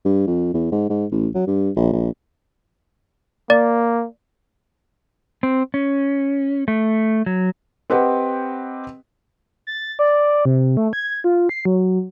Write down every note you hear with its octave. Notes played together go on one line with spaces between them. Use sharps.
G2
F2
E2
G#2
G#2
A1
F#3
G2
A#1
A#1
A#3 D5
C4
C#4
A3
F#3
C4 G4 B4 D#5 F#5 G5
A6
D5
C3
A3
G#6
F4
C7
F#3